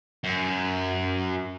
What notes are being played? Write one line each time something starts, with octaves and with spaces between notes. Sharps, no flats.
F#2